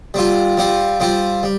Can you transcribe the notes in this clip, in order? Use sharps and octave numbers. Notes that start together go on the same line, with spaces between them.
G3 C4 F4
G3 C4 F4
G3 C4 F4
G3